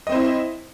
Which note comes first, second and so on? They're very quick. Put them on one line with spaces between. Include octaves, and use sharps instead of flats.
D#5 C4 C5 E4